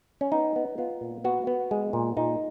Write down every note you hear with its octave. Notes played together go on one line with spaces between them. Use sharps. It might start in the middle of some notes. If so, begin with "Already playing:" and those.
C#4
B3 D#4
B3
B3 F4
A#2
B3 F#4
B3
G#3
A#2
A#2 D#4